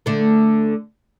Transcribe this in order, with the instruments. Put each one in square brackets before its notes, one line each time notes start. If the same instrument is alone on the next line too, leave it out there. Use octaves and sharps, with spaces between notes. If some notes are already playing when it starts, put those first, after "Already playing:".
[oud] D3 A3